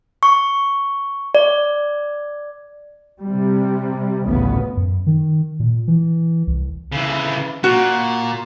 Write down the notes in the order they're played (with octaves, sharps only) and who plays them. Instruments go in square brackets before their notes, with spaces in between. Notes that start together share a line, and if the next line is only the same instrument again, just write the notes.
[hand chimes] C#6
D5
[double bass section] C3 G3
A1 D2 G2 A#2 C#3 B3
[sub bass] F#2
D#3
A#2
E3
C2
[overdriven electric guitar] C#3 E3
[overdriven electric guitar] A#2 [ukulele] F#4